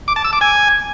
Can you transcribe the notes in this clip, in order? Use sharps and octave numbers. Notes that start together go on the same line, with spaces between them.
D6
A5
E6
D6
G#5